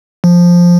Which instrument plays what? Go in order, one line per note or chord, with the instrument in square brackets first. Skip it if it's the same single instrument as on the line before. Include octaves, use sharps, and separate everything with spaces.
[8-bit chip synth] F3